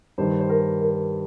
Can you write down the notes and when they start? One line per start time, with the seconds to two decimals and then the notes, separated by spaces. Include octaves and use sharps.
0.18 G2 D#3 C5
0.39 C5
0.49 A#4
0.81 A#4